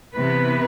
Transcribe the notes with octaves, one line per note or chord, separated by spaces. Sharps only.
C3 E3 B3 B4